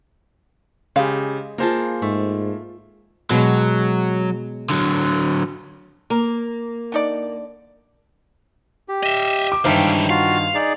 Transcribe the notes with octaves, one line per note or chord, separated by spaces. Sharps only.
C#3 G#3 G4 F5
A#3 F4 G#4 A#4 C5 A5
G#2 A3
B2 F#3 G#3
D3 F#3
A#3 A#4
D3 D#4 D5
G4
D#5 E5
D6
C#2 G2 D#3 E3 C5 E5 F5 G5
F4 F#4 F5
D#4 G#4 D5